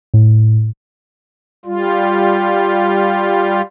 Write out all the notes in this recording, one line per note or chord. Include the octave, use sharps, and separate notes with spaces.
A2
G3 F4